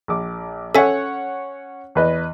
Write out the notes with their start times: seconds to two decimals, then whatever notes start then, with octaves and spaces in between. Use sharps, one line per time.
0.08 A#1 D6
0.75 C#4 A4 C#5 E5 F#5 G#5
1.95 E2 B4 D#5